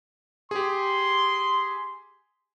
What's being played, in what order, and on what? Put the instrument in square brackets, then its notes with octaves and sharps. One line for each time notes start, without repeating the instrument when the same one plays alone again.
[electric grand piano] G4 G#4 [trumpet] C6